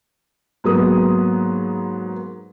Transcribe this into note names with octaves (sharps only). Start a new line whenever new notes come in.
G#2 F#3 A#3 B3 D#6